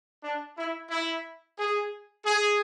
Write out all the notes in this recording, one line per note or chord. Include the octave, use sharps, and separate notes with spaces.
D4
E4
E4
G#4
G#4